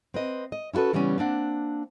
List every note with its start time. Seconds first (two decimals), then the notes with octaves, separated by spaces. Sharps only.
0.14 C4 B4 D#5
0.52 D#5
0.73 C#4 E4 F#4 A4 B4
0.93 C#3 E3 G3 A#3 B3 C#4
1.18 A#3 C4 D4 F#5